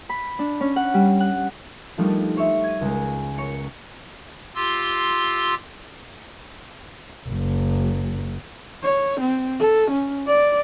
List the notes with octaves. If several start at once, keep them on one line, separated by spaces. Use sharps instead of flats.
B5
D4
C#4
F#5
G3
F#5
F3 G3 A3 D4 D#4 F4
C5 C#5 E5
G#6 D#7
C#2 G#3
C#5 A#5 C#7
F4 G4 C6 E6
F#1
C#5
C4
A4
C#4
D5